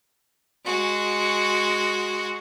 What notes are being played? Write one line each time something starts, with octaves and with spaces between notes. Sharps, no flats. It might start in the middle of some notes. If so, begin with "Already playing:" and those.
G#3 F#4